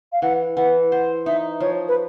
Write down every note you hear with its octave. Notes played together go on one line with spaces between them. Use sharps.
F5
E3 F#5
E3 F#5
C5 F#5
D#4 E5
F3 C#5
B4